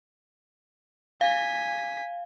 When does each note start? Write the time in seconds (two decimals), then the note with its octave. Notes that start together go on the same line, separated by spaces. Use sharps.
1.21 F5 G#5 B6